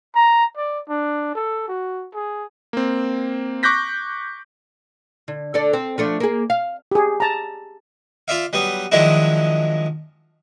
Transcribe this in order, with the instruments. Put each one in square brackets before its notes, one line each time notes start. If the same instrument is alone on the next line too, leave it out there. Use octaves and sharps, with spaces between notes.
[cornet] A#5
D5
D4
A4
F#4
G#4
[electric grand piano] A#3 C4
C#6 D6 F#6 G6 A#6 B6
[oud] D3
D3 A4 D5
C4
F3 A3 D4
A#3 G#4
F5
[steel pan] G4 G#4
A5 A#5
[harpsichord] F4 D5 E5 F5
F#3 G3 B3
D#3 F3 F#3 G#3 D4 E4